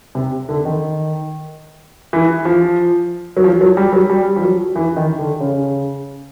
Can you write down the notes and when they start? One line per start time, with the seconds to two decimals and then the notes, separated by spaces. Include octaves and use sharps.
0.15 C3
0.49 D3
0.65 D#3
2.13 E3
2.45 F3
3.37 F#3
3.44 F3
3.61 F#3
3.77 G3
3.93 F#3
4.10 G3
4.36 F3
4.42 F#3
4.76 E3
4.96 D#3
5.19 D3
5.40 C#3